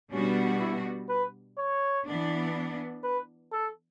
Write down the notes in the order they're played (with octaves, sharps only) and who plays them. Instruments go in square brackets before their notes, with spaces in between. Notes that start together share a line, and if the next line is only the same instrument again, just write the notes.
[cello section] B2 G3 B3 D4 F#4 [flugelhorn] C#4
[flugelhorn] E4
B4
C#5
[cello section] E3 B3 D4
[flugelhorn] B4
A4